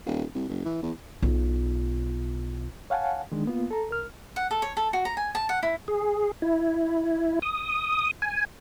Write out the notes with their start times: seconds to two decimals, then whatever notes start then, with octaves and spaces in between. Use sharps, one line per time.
0.06 D#1
0.35 C2
0.49 F#1
0.65 E3
0.82 E2
1.22 B1 F4
2.90 C#5 F5 F#5 G#5 A5
3.32 D#3 G#3 D4
3.46 A#3 B3 F4
3.71 A4 A#5
3.89 C2 A#4 F6
4.36 F#5
4.51 A4
4.62 C#5
4.77 A4
4.93 F#4
5.05 A#5
5.17 G#5
5.35 A5
5.49 F#5
5.63 E4
5.88 G#4
6.42 E4
7.42 D#6
8.22 G#5